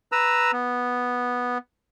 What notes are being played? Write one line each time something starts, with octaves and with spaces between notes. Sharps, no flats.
B4 A#5 E6
B3